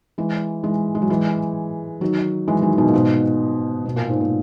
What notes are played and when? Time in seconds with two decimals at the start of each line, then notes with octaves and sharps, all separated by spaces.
0.18 E3 G#3
0.64 E3 G#3
0.95 G#3
1.02 F#3
1.10 E3 G#3
2.01 D#3 F#3
2.48 E3 G#3
2.62 D#3 F#3
2.78 B2 D#3
2.89 A#2
2.93 G#2 B2
3.86 B2
3.96 A#2
4.09 G#2
4.21 A#2